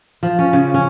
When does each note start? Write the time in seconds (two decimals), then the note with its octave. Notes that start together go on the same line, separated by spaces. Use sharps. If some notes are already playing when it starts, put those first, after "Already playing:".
0.23 F3
0.39 C#4
0.53 C#3
0.74 C#4